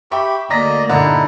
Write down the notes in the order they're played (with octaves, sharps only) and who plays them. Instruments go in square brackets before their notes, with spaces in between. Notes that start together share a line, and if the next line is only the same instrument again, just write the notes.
[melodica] G4 B5 [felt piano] E5 G5 C#6
[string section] D2 A#3 [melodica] D5 D#5 [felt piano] A#5 A#6 B6
[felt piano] G2 [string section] A#2 [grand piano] D3 [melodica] D#4 E4